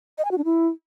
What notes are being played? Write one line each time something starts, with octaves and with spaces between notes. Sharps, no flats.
D#5
G#5
F#4
D4
E4